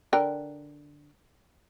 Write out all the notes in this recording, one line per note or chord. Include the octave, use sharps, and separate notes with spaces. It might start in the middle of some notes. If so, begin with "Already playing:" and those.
D3 A#4 G5